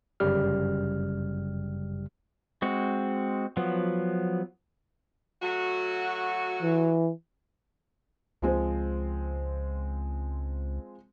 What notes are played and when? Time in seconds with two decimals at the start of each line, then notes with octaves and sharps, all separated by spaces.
0.20 G1 F#2 C#3 G3 G4 F6
2.62 G#3 C4 F#4
3.57 F3 F#3 B3
5.42 F#3 A3 F#4
6.62 E3
8.42 C#2 F3 G#3 C4